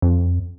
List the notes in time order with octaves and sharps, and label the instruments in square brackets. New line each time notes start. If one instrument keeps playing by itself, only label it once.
[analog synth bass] F2